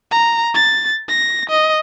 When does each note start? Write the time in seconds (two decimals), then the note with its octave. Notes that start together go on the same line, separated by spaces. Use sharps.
0.11 A#5
0.55 A6
1.09 A#6
1.50 D#5